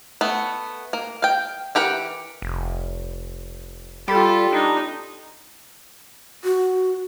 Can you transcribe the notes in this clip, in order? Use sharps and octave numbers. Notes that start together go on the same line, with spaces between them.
A3 B3
A#3
F5 G5
E3 G4 A#4 F#5
F1
G3 F4 G4 A4 B5
D4 D#4
F#4